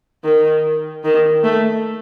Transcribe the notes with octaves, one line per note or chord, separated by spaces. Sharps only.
D#3
D#3
A3